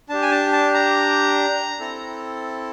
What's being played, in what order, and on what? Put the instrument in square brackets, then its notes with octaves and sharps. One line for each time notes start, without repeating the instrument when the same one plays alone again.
[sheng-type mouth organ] D4 G4 A5
G#5
A5
A5
A#5
C4 E4 A4